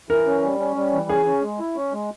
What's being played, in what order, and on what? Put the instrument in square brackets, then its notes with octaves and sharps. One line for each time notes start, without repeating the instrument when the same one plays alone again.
[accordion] E3 [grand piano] A#4
[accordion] C#4
G3
C#4
G3
E3
[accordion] C#4 [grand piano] G#4
[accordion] C#4
G#3
E4
C#4
G#3